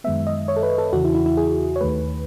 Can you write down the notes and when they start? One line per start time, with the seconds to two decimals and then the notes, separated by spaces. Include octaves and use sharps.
0.04 F#2 D#3 G#3 B3 E5
0.27 D#5
0.48 C#5
0.56 A4
0.63 B4
0.78 A4
0.93 E2 C#3 E3 F#4
1.04 E4
1.15 E4
1.26 E4
1.37 G#4
1.76 C#5
1.81 D#2 D#3 A3 B4